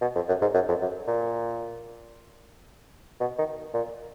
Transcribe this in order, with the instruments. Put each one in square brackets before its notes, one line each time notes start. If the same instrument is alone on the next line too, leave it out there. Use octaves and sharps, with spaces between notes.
[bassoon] B2
F2
F#2
G#2
F#2
F2
F#2
A#2
B2
D#3
A#2